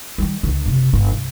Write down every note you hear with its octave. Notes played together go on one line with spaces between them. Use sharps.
D#3 G3
C#2 D3
F#1 C3
G1 D3
C2